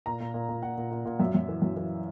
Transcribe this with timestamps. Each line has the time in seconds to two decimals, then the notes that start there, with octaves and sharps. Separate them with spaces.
0.06 A#2 A#5
0.20 A#2
0.34 A#2
0.49 A#2
0.62 A#2 F#5
0.77 A#2
0.91 A#2
1.05 A#2
1.20 F#2 E5
1.34 F#2
1.49 E3
1.62 F#2
1.77 E3